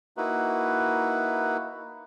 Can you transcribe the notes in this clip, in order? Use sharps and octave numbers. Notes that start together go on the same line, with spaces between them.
A#3 D#4 E4 F#4 B4